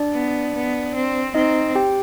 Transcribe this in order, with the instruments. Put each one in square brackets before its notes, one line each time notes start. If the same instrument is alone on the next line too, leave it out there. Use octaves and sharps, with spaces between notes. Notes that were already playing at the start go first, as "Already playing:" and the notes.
Already playing: [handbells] D4 D5
[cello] B3
B3
C4
[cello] C4 [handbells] D#4 D#5
[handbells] G4 G5